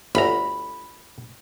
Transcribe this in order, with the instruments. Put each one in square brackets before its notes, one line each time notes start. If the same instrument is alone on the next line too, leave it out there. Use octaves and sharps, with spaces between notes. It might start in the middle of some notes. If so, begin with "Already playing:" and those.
[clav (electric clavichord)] G1 D2 A#5 [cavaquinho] B5